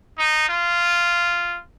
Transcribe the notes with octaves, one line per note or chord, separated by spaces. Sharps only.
D#4
F4